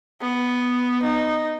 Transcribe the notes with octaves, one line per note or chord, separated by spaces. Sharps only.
B3
D#4